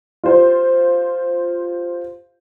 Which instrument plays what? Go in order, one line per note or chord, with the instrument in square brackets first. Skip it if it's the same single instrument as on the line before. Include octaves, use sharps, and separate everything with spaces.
[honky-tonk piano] F4 G4 C5